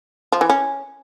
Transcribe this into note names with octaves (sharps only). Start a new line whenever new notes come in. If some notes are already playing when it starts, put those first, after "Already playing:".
F3
E3
C#4